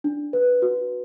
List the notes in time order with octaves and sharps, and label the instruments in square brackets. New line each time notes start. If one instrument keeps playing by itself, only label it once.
[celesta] D4
B4
F#4